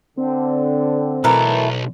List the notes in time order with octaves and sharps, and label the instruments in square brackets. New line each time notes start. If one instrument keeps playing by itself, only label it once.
[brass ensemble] D3 [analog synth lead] C4
[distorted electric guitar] B1 [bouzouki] E3 A3 A#4